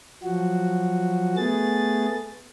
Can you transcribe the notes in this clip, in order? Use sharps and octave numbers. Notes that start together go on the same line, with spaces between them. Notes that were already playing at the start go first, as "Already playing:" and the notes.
F3 F#3 F#4
A3 B3 G#4 A6